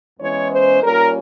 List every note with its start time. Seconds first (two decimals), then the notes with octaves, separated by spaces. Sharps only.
0.18 E2 E3 G#3 C#4 C#5
0.50 C5
0.81 A#2 G3 C#4 A#4